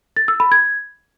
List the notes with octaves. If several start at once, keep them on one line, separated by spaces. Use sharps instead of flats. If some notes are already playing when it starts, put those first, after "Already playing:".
A6
E6
B5
G#6